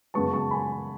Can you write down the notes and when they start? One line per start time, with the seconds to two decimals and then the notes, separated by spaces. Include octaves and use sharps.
0.14 F#2 C#3 G#3 B3 A5 C#6
0.34 A5 C#6
0.51 G#5 B5